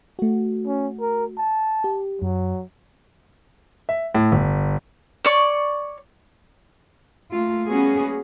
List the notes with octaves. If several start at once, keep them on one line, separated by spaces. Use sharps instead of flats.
A3 F#4
C#4
A#4
A5
G4
F#2 F#3
E5
A2
G1
C#5 D5 C#6
A3 A#3 F4
G3 A#3 B3 C#4 F#4 G#4